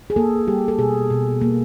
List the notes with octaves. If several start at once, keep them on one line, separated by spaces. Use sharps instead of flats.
G#4
A#3 A4
G3 G4
A4
B2 G#4
B2
A#3